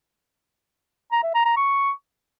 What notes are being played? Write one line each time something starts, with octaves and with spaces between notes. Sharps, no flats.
A#5
E5
A#5
A#5
C#6